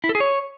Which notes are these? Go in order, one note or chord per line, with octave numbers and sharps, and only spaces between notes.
E4
A4
G#4
C#5